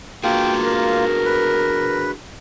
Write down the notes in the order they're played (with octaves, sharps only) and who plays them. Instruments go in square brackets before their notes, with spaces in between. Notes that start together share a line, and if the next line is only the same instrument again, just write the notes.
[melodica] A#3 F4 [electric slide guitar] D4 F#4 G#4 [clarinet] G5
[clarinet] A#4
[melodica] B4